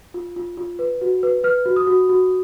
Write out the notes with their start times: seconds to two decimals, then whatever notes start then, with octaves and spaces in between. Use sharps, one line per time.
0.14 F4
0.36 F4
0.57 F4
0.79 B4
1.01 F#4
1.23 B4
1.44 B4 F6
1.66 F#4
1.76 D#6
1.87 F#4
2.09 F#4